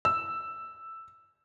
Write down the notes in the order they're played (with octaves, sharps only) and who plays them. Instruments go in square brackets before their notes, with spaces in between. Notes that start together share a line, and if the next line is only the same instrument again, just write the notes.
[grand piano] E6